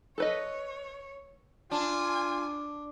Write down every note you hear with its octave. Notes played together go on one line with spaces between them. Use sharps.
A4 B4 C#5 D#5
D4 F4 G#5